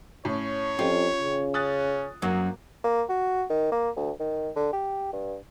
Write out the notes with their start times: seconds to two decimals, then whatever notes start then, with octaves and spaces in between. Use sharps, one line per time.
0.25 A2 C#4 C#5
0.79 F2 C#4 F4 G4
1.20 C#3
1.54 C#4 D#6 F#6 A6
2.22 F#2 A#3 F#4
2.84 A#3
3.09 F#4
3.50 D#3
3.72 A#3
3.96 D2
4.19 D#3
4.56 D3
4.73 G4
5.13 G2